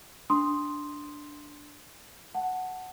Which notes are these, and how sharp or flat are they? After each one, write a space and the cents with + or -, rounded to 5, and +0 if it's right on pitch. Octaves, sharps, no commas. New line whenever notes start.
D4 +0 C6 +0 D#6 +0
F#5 +0 A5 +0